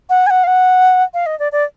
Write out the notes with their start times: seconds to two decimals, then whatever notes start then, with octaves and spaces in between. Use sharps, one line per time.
0.10 F#5
0.27 G#5
0.30 F#5
0.44 F5
0.47 F#5
1.14 F5
1.26 D#5
1.39 D5
1.52 D5